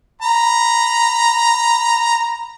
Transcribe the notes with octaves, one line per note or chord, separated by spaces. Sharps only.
A#5 B5